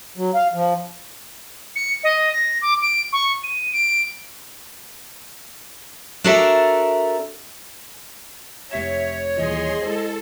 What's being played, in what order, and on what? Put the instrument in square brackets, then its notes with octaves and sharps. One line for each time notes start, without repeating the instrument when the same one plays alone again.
[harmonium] F#3
F5
F3
[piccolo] C#7
D#5
A#6
D6
D7
C#6
D#7
D7
[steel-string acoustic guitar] D4 F#4 A4 A#4 D5 E5
[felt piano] F1 G4 E7 [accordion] C#5 [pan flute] E5
[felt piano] D#1 E3 F4 [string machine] G#4 C6 [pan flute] D#5
[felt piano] G#3 E4 C5 [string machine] A4